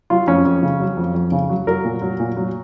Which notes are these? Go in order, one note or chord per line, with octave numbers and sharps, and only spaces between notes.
F#3 F4
F2 C#4
F2
C#3
F#3
F2
F2
C#3
F#3
F#3 A#4
A#2
F#3
A#2
F#3